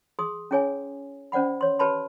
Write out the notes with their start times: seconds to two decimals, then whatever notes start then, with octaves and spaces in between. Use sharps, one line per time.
0.19 G#4 C6 D#6
0.51 C#4 E4 G#4 C#5 G#5
1.32 C#4 C5 D5 F#5 B5
1.61 C#5 C6
1.79 G4 B4 C#5 A5 B5 C6